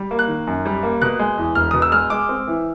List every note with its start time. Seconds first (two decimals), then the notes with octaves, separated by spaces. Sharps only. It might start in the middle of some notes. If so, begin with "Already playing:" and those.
Already playing: G3
0.11 A#3
0.19 F#6
0.28 D#3
0.47 F#2
0.66 G3
0.83 A#3
1.02 B2 F#6
1.19 G#3
1.38 E2
1.55 E1 F6
1.71 B2 D#6
1.82 E6
1.92 G#3 F6
2.10 G#3 D6
2.29 C4
2.47 E3